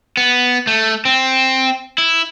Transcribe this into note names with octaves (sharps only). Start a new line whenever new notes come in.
B3
A3
C4
E4